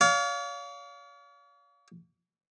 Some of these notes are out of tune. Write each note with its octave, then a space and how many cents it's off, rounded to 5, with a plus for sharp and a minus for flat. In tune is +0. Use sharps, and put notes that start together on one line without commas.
C#5 +45 F5 +10